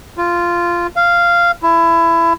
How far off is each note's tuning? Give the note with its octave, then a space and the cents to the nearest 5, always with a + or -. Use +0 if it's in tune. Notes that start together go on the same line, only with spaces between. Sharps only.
F4 -10
F5 -10
E4 +25